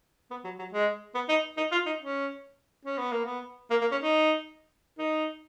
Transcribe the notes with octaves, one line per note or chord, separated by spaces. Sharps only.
B3
F#3
F#3
G#3
B3
D#4
D#4
F4
D#4
C#4
C#4
B3
A#3
B3
A#3
A#3
C#4
D#4
D#4